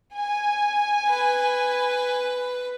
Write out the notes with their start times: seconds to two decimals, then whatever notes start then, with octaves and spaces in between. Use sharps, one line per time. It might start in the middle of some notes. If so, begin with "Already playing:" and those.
0.13 G#5
1.09 B4